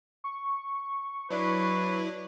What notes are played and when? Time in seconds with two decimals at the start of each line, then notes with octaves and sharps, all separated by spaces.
0.24 C#6
1.30 F#3 D4 E4 B4